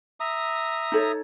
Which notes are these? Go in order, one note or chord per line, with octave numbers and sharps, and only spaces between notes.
E5 A#5 D#6
D#4 A4 C#5